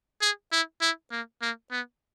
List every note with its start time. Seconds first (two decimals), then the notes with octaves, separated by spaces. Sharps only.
0.22 G#4
0.52 E4
0.81 E4
1.12 A#3
1.42 A#3
1.71 B3